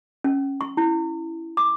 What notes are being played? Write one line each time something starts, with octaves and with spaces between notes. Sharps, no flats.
C#4
C#6
E4
D6